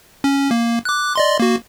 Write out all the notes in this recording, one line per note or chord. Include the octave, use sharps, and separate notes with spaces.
C#4
A#3
D6 F#6
D5 D#5 C6
A#3 F#4